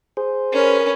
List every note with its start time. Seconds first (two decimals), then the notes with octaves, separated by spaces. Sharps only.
0.17 G#4 C5
0.52 C#4 A#4 B4